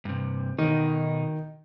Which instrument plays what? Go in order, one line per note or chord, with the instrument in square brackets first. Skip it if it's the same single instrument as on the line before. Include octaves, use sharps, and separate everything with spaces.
[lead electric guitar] G2 C3
[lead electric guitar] B2 D#4 [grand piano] D#3